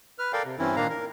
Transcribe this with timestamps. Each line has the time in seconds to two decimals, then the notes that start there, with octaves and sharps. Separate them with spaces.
0.19 B4 F6
0.33 A4 A#4 D5 F5 G5
0.45 C3
0.59 G2 E3 C4 C#4 E4
0.76 A#2 D#3 A#3 D4 F5 A#5
0.90 A#4